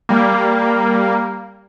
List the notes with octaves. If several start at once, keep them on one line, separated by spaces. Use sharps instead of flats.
G3 A#3